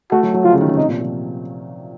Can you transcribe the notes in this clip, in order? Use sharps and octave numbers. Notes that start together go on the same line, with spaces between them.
A3 F#4
F#3
F#3
F3 F4
C#3
D#3
C#3
C3 D#4
A#2
F3